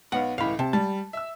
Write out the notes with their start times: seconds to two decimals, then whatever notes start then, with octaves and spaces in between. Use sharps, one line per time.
0.12 B1 B3 F5 F#5
0.38 C#2 A2 E3 F5 B5
0.59 C3 A5
0.73 G3 A5
1.13 E5 E6